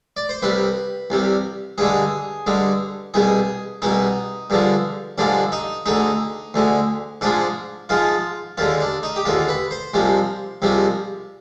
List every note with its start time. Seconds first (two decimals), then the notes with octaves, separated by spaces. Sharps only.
0.17 D5
0.29 C5
0.42 C2 C3 G3 B4
1.10 C2 C3 G3
1.78 G2 D3 G#3 G#4
2.47 G2 D3 G#3
3.14 C2 B2 G#3 G#4
3.82 C2 B2 G#3 D#4
4.50 G2 D3 F3 G#3
5.18 G2 D3 F3 G#3 D4
5.52 D#4
5.86 D2 D3 G#3 D#4
6.54 D2 D3 G#3
7.21 G#2 F3 G#3 D4
7.89 G#2 F3 G#3 F4
8.57 D#2 D3 G#3 F4
8.80 D4
9.03 D#4
9.16 G4
9.25 D#2 D3 G#3 F4
9.48 B4
9.71 C5
9.94 C2 C3 F3 G#3
10.62 C2 C3 F3 G#3